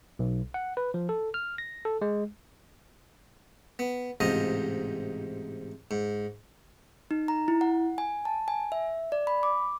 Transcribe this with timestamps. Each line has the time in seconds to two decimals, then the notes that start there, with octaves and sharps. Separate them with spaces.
0.19 B1
0.54 F#5
0.77 B4
0.94 F3
1.09 A4
1.34 F6
1.58 A#6
1.85 A4
2.02 G#3
3.79 B3
4.20 A1 G#2 C3 F4 D#5 D#6
5.91 G#2
7.11 D#4
7.28 A#5
7.48 E4
7.61 F#5
7.98 G#5
8.25 A5
8.48 G#5
8.72 E5
9.12 D5
9.27 B5
9.43 D6